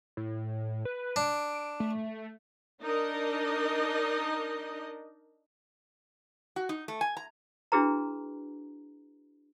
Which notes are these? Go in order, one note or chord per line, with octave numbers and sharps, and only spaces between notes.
A2
B4
D4 D7
A3
D4 D#4 A#4 D#5
F#4
D#4
A3
G#5
A#5
D4 E4 F#4 G#4 B4 A#5